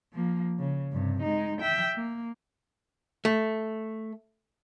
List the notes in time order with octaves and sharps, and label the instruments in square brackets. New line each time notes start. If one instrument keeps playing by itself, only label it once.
[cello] F3 A#3
C#3
G2 C3
G#3 D#4
E5 G5
A#3
[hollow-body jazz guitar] A3